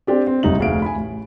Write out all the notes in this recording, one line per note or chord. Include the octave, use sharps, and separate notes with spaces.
C4 D4 G4 D5
C4
F#1 G2 C3 D#4 F#7
F1 D2 G#4 F5 D7
G#5 B5
A1